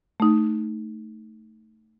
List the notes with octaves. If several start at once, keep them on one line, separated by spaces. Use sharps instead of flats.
A3 D#4